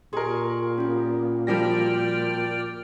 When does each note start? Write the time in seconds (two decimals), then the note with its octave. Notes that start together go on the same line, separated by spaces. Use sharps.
0.13 A#2 G4 G#4 A#4 C6
0.78 B3 C#4 F4
1.47 F3 G3 F#4 A#4 D5 G5 F6 A#6